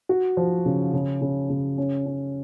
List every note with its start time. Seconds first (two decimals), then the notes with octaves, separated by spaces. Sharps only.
0.09 F#4
0.37 F3
0.66 C#3
0.93 C#3
1.21 C#3
1.50 C#3
1.78 C#4
2.06 C#4